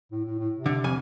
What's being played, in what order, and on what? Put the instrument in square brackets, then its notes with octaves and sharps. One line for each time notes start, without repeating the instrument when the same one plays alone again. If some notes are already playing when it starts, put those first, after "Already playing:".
[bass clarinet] A2
A2
A2
C3
[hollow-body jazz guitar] D3
F2 G#5